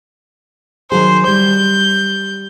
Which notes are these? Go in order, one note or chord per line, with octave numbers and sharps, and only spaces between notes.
D#3 F#3 G#4 C5
G3 G6